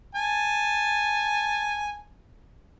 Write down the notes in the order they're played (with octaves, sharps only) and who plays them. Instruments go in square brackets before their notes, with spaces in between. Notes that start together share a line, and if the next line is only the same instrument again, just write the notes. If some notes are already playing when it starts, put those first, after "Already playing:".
[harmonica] G#5 A5